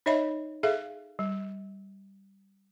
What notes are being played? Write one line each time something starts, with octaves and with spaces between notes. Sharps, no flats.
D#4 C#5 D#5 E5 B5
G#4 A4 E5 F5
G3